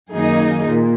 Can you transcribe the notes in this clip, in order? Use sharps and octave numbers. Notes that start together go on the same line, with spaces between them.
F#2 D#3 A#3 D#4 G#4
A#2